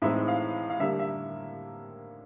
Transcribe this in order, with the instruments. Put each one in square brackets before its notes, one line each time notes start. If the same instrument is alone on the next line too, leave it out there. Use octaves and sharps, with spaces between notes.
[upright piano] A2 E3 G#3 C4 D#4 E5
F5
F5
D3 G3 A#3 E5
E5